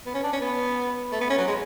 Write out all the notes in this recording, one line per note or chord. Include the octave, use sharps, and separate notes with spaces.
B3
C#4
D4
C#4
B3
A3
B3
C#4
F#3
G#3